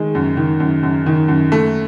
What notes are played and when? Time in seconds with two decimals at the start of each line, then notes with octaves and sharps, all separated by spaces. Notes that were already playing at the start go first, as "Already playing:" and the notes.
Already playing: D#3 G#3
0.15 F#2
0.37 D#3
0.60 F#2
0.83 F#2
1.06 D#3
1.28 F#2
1.52 A3